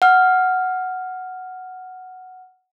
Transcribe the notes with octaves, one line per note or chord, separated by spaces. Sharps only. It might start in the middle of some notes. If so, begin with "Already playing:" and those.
F#5 F6